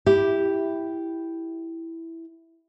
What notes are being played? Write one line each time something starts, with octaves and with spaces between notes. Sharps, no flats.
E4 G4